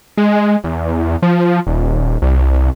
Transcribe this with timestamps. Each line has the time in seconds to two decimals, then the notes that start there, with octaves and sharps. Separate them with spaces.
0.17 G#3
0.64 E2
1.22 F3
1.67 D#1
2.22 C2